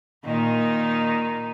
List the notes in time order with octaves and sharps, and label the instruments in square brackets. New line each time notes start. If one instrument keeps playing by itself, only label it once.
[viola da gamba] A#2 D#3 D#4